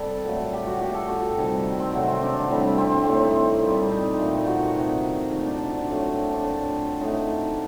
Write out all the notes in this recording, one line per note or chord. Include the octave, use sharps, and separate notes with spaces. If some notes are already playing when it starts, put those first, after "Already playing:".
Already playing: C3 G3 A4
A#2 F#3 A3
G4
F#4
A#2 A3 G4
A4
F#4
C3 D#3 G3
C4
C3 D#3 F#3 A3 F#4
C4
D4
A2 G3
C4
C4
A2 A3 C4
D#4
A#2 G3
D#4
A#2 A3
F#4
C3 D#3 A3
A#2 A3 D#4
D4
A2 F#3 A3
C4
D4
A#2 A3
A2 A3 D#4